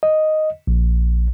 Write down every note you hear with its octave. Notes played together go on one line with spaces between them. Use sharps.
D#5
A#1